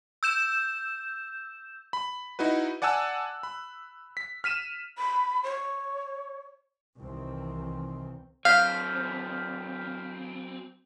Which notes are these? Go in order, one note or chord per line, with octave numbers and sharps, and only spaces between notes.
E6 G6 E7
B5
D#4 E4 F#4 B4
D5 F#5 G#5 A5 E6 F#6
B5
B6
F6 B6 D#7 E7
B5
C#5
C2 C3 D#3 E3 C4
F#3 C4 F5 F6 G6 B6